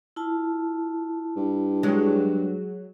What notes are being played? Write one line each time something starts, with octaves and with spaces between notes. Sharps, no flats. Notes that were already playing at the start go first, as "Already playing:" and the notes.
E4 F4 A5
G2
F#3 G#3